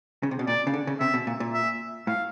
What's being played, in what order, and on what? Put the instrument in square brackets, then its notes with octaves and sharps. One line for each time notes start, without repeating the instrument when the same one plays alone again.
[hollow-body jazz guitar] C#3
C3
B2
[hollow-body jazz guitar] A#2 [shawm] D5
[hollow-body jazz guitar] C#3
D3
C#3
[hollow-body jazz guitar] C3 [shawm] E5
[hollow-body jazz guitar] B2
A#2
A#2
[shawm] E5
[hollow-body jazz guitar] A2 [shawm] F5